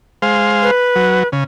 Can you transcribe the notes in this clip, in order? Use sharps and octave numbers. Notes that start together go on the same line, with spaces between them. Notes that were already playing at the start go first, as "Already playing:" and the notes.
G#3 C5 F5
B4
F#3
C#3